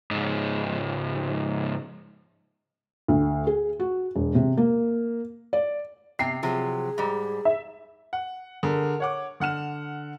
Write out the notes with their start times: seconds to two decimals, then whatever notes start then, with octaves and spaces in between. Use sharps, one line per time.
0.11 C#2 G#2
3.08 D2
3.47 G#4
3.80 F#4
4.15 E1
4.35 C3
4.57 A#3
5.53 D5
6.19 C3 B3 G5 C7
6.43 C3 F3 F#3 G#4
6.98 G#2 G3
7.45 E5
8.13 F#5
8.63 D3 G#4 A#4
9.00 C#5 F#5 D6
9.40 D3 F#5 F6 E7